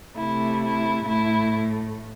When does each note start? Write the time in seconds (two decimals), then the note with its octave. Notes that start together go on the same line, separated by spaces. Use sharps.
0.16 C3 A3 E4
0.62 E4
1.06 A2 A3 E4